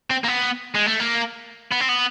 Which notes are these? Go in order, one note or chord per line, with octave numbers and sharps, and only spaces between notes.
C4
A#3
B3
G#3
A3
A#3
B3
C4
B3